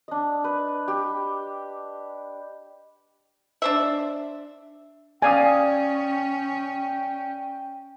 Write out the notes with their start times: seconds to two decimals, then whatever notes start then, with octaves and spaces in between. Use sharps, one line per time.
0.08 D4 D#5
0.44 B4
0.88 G4
3.62 D4 C5 E5
5.22 C#4 D5 F5 G5 G#5 D#6